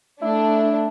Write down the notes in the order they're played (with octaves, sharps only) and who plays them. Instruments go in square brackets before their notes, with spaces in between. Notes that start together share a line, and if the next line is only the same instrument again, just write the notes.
[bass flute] A3 [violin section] D4 [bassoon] E4